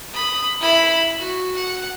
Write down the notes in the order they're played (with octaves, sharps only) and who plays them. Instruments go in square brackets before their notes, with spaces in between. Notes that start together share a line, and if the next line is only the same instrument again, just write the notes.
[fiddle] B5 D#6
E4 B5
F#4
F#5